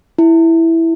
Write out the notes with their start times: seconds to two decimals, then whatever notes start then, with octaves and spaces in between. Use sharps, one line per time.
0.18 E4